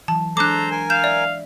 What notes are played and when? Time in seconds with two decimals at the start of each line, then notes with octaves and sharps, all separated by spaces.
0.08 E3 F#3 A5
0.37 G#3 D4 A4 C5 A#5 D6 F#6
0.71 A#4 G#5
0.90 F5 G6 E7
1.04 D5 E5